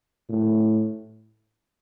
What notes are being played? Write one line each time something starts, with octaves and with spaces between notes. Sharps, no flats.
A2